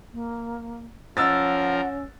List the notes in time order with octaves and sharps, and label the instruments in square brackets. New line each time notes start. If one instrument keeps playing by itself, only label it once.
[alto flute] A#3
[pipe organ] F3 A#4 [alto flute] C#4 [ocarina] F#5 [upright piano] E6 A6